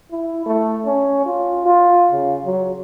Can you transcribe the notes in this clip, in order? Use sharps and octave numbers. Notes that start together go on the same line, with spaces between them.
E4
A3
C#4
F4
F4
C#3
F#3